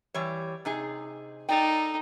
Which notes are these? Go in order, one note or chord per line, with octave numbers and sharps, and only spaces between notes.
E3 G3 C#5
C3 D#4 G#4
D#4 A4 D5 G5